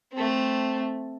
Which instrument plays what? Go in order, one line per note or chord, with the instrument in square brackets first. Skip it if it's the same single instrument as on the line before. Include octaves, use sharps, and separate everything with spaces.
[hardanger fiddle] A3 C4